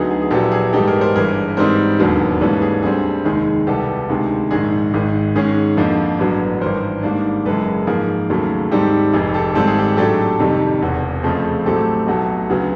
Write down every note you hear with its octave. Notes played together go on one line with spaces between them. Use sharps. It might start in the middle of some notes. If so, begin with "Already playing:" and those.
Already playing: D2 D3 F#3 B3 D#4 G#4
G#4
G#4
A#1 A#2 F#3 B3 E4 G4 A4
G#4
G#2 E3 G3 B3 D#4 G4 A4
G#4 A#4
A#4 C5
G1 G2 E3 G#4 A#4
G#2 E3 G3 C4 D#4 A#4 C5
E1 D#2 D3 F#3 B3
G#2 E3 G3 A#3 C#4 A4 B4
G#4
D2 D3 G3 C4 G#4
F1 D#2 D#3 G#3 G#4
C2 B2 G3 B3 G4 A4
D2 C3 D#3 G#3
A#1 G#2 D#3 G#3 G#4
G#1 G#2 D#3
G#2 D#3 G#3 C#4 G#4
F2 D3 F3 A#3
A1 G2 D3 F#3 B3
G#1 G2 E3 A#4 C5
G#2 D#3 G3 A#3 D4
F#1 F#2 C#3 E3 G#3 A4 B4
G#2 F3 A#3 G#4 A#4
D#2 C#3 F#3 A3
G#2 D#3 G3 C4 G4 A4
F1 F2 C3 G#4
G4 A4
G#1 G#2 D#3 G3 C4 A4
G#4
G4 A4
A2 F#3 A3 D4 G4 A4
F2 C3 D#3 G3
E1 E2 C3 E3
F2 C#3 F3 A3 C4 G#4
A1 A2 F#3 A3 C4 G4 A4
B1 B2 F#3 A3
D2 C#3 F#3 B3